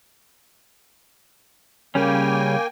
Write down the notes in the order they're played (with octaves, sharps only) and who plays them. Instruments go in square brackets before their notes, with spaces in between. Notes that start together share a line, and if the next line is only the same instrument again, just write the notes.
[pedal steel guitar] C#3 G3 C#4 [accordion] A#3 G5 G#5